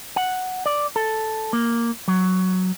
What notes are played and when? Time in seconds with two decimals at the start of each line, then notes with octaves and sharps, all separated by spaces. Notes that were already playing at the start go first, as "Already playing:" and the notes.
0.16 F#5
0.66 D5
0.96 A4
1.53 A#3
2.08 F#3